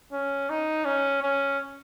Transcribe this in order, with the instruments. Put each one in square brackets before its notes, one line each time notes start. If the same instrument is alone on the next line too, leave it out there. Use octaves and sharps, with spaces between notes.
[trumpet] C#4
D#4
C#4
C#4